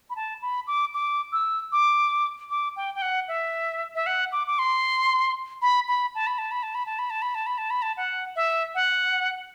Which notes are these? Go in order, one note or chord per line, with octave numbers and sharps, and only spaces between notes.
B5
A5
B5
D6
D6
E6
D6
D6
G5
G5
F#5
E5
E5
F#5
D6
D6
C6
B5
B5
A5
B5
A5
B5
A5
B5
A5
B5
A5
B5
A5
B5
A5
B5
A5
F#5
E5
F#5